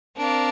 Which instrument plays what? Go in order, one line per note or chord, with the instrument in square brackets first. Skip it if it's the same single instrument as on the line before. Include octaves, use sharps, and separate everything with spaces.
[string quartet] C4 A#4 D5 F5 [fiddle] D4